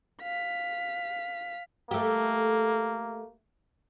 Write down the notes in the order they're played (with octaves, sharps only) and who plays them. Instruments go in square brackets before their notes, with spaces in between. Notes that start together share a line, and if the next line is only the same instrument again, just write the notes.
[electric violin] F5 B6
[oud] A3 G4 [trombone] A#3